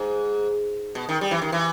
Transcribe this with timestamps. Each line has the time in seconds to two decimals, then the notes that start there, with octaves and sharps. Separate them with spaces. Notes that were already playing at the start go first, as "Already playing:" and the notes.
Already playing: G#2
0.95 B2
1.09 D#3
1.21 G3
1.31 E3
1.42 D#3
1.52 E3